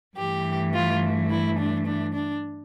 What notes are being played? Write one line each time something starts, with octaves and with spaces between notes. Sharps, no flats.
G2 E3 A3 G4
F4
E4
D4
D4
D4